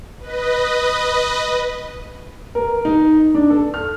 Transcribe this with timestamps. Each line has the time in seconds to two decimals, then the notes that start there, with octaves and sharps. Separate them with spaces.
0.20 B4 D#5
2.55 A#4
2.85 D#4
3.34 D4
3.50 A4
3.74 F6